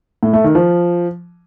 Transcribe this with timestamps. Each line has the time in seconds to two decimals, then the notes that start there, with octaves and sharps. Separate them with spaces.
0.23 A2
0.33 A3
0.44 D#3
0.55 F3